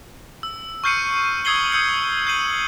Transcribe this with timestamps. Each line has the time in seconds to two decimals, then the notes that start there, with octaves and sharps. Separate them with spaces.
0.43 E6
0.84 C#6 F6 G6 C7 C#7 D#7
1.45 D#6 E6 G#6 C7 F#7 G7
1.72 D#6 E6 G6 C#7
2.27 G6 C7 D#7 F#7